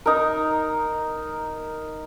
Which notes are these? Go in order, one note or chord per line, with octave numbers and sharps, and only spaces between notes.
D#4 A#4